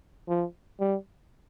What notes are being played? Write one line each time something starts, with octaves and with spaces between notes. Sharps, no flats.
F3
G3